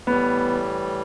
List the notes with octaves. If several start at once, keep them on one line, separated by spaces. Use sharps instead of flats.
A2 E3 G3 B3